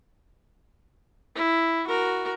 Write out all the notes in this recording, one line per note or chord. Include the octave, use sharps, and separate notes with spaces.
E4
F#4 A#4